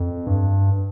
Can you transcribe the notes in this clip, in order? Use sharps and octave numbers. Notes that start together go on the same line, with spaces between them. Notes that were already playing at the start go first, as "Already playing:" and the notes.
Already playing: F2
G2